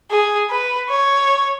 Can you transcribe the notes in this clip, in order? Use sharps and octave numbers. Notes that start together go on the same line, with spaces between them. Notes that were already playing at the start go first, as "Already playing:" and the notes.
G#4
B4
C#5